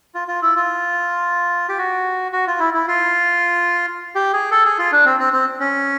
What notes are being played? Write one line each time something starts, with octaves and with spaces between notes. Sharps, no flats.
F4
F4
E4
F4
G4
F#4
F#4
F4
E4
E4
F4
G4
G#4
A4
G#4
F4
D4
C4
C4
C4
C#4